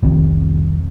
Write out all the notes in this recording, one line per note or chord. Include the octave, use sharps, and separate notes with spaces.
F1 C2 C3 D#3